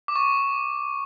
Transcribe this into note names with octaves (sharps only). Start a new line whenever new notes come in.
D6
C#6